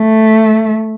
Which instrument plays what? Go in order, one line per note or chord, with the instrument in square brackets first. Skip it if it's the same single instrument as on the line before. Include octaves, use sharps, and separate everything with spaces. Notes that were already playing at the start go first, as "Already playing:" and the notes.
Already playing: [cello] A3